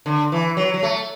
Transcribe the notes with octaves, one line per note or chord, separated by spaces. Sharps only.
D3
E3
F#3
F#3
A3